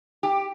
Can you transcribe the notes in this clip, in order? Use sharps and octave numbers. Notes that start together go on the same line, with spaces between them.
G4